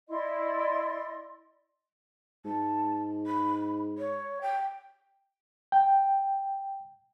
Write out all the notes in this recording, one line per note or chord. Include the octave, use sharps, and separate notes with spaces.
E4 D5 D#5 C6
G#2 A5
B5
C#5
G5
G5